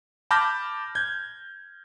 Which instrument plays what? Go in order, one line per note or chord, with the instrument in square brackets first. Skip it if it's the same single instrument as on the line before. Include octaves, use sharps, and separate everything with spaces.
[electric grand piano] A5 B5 D6 F6 G6 A#6
G6 G#6